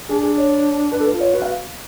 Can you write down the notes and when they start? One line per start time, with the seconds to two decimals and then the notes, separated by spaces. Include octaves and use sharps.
0.09 D4 G#4
0.23 G#4
0.37 C#5
0.92 D4 B4
1.00 A4
1.06 B4
1.13 F4
1.20 C#5
1.34 F#4 B4
1.42 F5